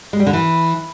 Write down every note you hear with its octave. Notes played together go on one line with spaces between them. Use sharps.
G#3
G3
D3
E3